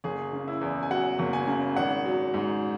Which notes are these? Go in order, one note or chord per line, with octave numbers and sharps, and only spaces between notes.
F#1 G#4
C#3
E4
E2
G#5
F#3 F#5
F#1
G#5
C#3
G#1 F#5
F#3
G#2